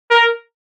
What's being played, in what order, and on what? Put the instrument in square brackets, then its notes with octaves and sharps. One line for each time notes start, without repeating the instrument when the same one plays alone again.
[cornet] A#4